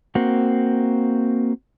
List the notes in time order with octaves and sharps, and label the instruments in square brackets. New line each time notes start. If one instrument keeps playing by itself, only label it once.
[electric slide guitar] A#3 C4 F#4